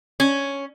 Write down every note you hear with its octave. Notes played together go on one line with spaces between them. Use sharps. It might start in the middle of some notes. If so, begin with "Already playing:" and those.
C#4